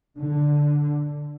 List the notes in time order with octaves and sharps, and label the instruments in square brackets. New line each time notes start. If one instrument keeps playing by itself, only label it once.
[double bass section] D3